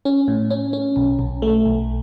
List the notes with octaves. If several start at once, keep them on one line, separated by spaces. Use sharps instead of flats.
C#4
A2
C#4
C#4
B1
B1
A3
B1